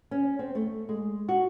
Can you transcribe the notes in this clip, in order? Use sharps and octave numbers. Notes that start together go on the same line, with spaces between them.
C#4
C4
A3
G#3
F#4